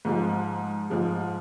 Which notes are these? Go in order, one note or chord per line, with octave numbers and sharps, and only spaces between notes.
G#2 F3 G#3
G#2 F3 G#3